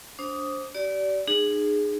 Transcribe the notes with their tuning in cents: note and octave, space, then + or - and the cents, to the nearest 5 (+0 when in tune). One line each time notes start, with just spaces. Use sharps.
D4 -25 C5 +15 D#6 +0
G4 -40 D5 -20
D#4 -45 G#4 +0